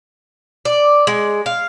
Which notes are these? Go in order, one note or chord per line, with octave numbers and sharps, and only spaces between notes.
D5
G#3
F5